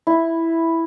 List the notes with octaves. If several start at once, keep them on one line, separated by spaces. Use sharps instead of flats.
E4